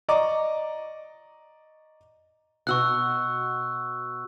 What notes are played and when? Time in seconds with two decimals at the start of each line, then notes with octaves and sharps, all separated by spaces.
0.09 D5 D#5 A#5 C#6 D6
2.67 B2 F#4 F#5 C#6 E6 F#6